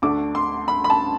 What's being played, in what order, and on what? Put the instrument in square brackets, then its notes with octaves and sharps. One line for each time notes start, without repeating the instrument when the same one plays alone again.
[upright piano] D2 D3 A3 D4 D6
C6
B5
B5
A5